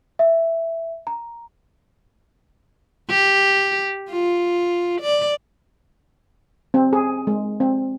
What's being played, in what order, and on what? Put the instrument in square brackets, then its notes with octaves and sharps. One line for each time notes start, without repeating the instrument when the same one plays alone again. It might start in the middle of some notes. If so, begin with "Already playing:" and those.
[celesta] E5
A#5
[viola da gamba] G4
F4
D5
[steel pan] C4
G#4
G#3
C4